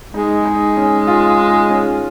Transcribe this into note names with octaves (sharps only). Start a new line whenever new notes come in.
G#3 D#4
D#4
C#4
F4
D#4
C#4